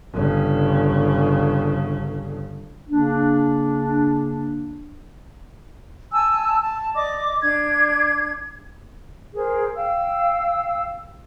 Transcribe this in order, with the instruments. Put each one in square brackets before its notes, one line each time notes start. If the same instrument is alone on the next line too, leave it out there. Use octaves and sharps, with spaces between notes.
[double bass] G1 C#3
[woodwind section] C#3 A#3 D4
[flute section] G#5 A5 E6
A5
D5 D#5 D6
D4 G#6
G#4 A#4 C5
F5 G5 E6